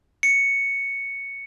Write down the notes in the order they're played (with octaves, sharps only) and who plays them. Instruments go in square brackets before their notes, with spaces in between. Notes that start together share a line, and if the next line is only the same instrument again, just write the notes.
[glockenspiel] C#7